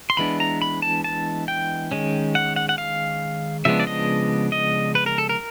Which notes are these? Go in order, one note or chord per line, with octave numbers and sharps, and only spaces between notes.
C6
E3 G#3 B3 D4 B5
A#5
B5
A5
A5
G5
D#3 G#3 C#4
F#5
F#5
F#5
F5
C#3 F3 G#3 B3 D4 E5
D5
D#5
D#5
B4
A#4
A4
A#4